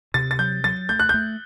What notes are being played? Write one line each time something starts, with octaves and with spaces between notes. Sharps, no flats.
C3 A6
A6
F#3 G6
F#3 A6
A3 G6
F#6
A3 G6